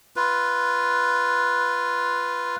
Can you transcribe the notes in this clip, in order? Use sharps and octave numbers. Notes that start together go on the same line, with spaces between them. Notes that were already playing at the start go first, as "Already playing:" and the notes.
F4 B4